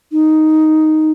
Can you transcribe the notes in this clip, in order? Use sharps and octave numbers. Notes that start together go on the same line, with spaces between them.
D#4